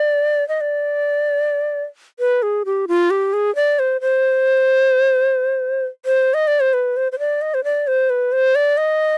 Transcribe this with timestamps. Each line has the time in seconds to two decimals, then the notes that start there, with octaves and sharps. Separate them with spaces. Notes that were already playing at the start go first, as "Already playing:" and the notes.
Already playing: D5
0.49 D#5
0.61 D5
2.20 B4
2.43 G#4
2.65 G4
2.88 F4
3.10 G4
3.33 G#4
3.55 D5
3.79 C5
4.01 C5
6.06 C5
6.34 D#5
6.47 D5
6.60 C5
6.74 B4
6.97 C5
7.12 C5
7.19 D5
7.42 D#5
7.54 C5
7.64 D5
7.87 C5
8.10 B4
8.32 C5
8.55 D5
8.77 D#5